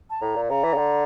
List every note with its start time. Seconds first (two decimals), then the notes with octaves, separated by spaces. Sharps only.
0.10 A5
0.21 A2 A#5
0.35 A#2
0.50 C#3 A#5
0.64 E3
0.73 C#3
0.77 D3